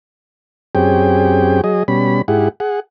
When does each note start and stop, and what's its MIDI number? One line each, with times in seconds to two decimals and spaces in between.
0.75 1.61 42
0.75 1.61 60
0.75 1.61 61
0.75 1.61 67
0.75 1.61 68
0.75 1.61 79
1.64 1.83 54
1.64 1.83 68
1.64 1.83 75
1.88 2.22 47
1.88 2.22 55
1.88 2.22 61
1.88 2.22 83
2.28 2.48 44
2.28 2.48 64
2.28 2.48 67
2.28 2.48 68
2.28 2.48 78
2.60 2.80 68
2.60 2.80 78